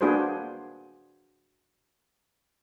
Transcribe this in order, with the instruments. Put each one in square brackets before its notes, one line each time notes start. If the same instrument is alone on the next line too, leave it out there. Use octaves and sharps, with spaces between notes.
[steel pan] A#3 D4 F#4 G#4 B4 C5